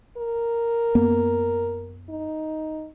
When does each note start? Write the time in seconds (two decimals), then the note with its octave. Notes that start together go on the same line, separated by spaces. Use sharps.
0.18 A#4
0.95 F#2 A#3 B3
2.10 D#4